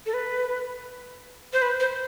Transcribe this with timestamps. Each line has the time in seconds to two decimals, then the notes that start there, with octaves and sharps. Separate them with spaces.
0.06 A4
0.14 B4
1.53 C5
1.62 B4
1.80 C5